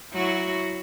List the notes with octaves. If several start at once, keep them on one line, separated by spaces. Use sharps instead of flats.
F#3 E4 F#4